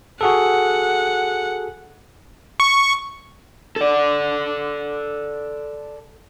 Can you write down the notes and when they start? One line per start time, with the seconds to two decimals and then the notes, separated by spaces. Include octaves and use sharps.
0.21 F#4 G#4 A4 F#5
2.60 C#6
3.76 A4 D5